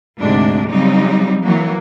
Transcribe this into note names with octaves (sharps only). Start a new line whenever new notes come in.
D2 G#2 C3 D4
C#3 F#3 G3 C4 D#4
E3 F#3 A#3